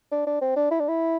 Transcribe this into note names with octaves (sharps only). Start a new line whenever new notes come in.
D4
D4
C4
D4
E4
D4
E4